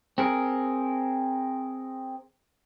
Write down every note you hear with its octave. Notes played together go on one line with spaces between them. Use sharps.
C4 G#4 A#4